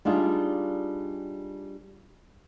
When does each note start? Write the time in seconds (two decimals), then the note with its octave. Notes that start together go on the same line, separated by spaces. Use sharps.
0.05 G3 D4 D#4 F4 G#4